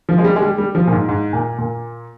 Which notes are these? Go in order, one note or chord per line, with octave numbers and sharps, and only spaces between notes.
F3
G#3
G3
G#3
G3
G3
F3
A#2
G#2
G#2
A#2
A#2